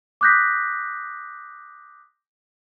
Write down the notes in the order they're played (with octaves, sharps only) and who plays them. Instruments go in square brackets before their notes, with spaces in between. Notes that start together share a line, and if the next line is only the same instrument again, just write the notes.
[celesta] D6 D#6 F#6 G6 A#6 B6